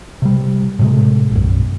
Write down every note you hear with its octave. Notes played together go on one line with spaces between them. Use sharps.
C3 G3
A2 C3 G#3
B1 F#2